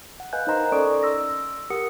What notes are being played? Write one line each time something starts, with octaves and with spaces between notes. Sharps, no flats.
F#5
B4 D#5 F5 G#5 F#6 G6
D#4 A#4 C5 D#5 A#5 C6
C#4 A4 D5 C#6 D#6 D7
C6 E6 A#6
G4 A#4 F#5 D#6 C#7